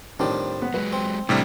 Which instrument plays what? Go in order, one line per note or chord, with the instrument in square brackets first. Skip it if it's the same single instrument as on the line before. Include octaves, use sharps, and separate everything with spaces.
[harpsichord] A2 F3 G3 [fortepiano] D#3 C4 D4
[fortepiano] B3
[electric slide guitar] F#3 G#3 [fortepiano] B4
[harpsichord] C4
[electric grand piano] A2 C3 G3 [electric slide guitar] E3 D4 [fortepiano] G5 F6